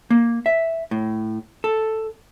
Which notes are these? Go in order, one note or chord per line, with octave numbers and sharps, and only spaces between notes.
A#3
E5
A2
A4